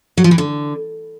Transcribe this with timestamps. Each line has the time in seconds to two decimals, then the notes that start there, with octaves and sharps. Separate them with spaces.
0.17 F#3
0.24 F3
0.31 E3
0.38 D3